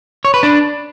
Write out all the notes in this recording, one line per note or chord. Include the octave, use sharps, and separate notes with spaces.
C#5
B4
D4